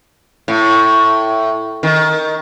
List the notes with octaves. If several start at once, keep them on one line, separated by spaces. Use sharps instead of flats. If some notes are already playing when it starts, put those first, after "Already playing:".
A2
D#3